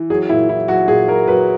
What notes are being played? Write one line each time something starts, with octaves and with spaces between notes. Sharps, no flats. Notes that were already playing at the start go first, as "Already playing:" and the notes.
Already playing: E3
F#3 G#4
A#2 E4
F#3 E4
F#3 F#4
A#2 G#4
F#3 A#4
F#3 B4